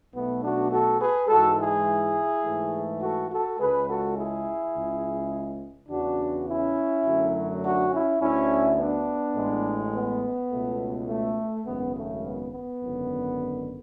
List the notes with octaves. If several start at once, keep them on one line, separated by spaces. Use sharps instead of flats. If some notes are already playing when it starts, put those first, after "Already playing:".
B1 B2 A3 B3
D4 F#4
F#4 A4
G#4 B4
G#2 E3 G#3 F#4 A4
E4 G#4
G#2 E3 A3
F#4 A4
F#4 A4
C#2 C#3 G#3 G#4 B4
F#4 A4
E4 G#4
C#2 C#3 G#3
E2 C#3 E3 D4 F#4
C#4 E4
F#2 D3 F#3 A3
D4 F#4
C#4 E4
D2 D3 A3 C#4 E4
B3 D4
A1 A2 G#3
B3
C#2 B2 A3
A3
G#1 F#2 C#3 G#3 B3
A3
B3
B3
G#1 F#2 D3